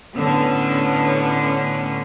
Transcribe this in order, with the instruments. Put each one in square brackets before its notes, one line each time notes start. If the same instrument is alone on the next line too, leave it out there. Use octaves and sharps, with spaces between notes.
[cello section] A2 D3 B3 C#4